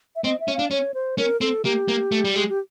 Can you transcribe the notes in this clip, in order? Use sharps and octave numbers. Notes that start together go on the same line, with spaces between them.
E5
C4 D#5
E5
C#4
D4 F5
C#4 C#5
C5
C#4 A#4
C4 A4
A#3 G4
A#3
A3
G3
G#3
G4